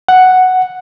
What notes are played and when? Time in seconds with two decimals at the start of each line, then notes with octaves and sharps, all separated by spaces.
0.08 F#5